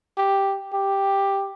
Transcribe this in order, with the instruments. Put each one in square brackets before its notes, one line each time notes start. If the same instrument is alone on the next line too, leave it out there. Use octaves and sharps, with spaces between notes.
[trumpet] G4
G4